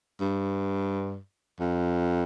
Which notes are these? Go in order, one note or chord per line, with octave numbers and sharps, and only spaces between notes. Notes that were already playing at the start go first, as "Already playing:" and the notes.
G2
F2